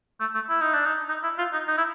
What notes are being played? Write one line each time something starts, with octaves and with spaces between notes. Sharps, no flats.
A3
A3
E4
D#4
D4
D#4
D#4
E4
F4
D#4
D#4
E4